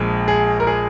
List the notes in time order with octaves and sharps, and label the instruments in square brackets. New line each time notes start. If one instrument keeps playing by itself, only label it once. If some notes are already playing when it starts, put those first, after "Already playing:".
Already playing: [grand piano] A#1 A#2 F3 G#3
G#4
A#4
G#4